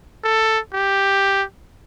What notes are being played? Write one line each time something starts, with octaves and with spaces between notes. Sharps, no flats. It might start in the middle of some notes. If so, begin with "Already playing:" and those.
A4
G4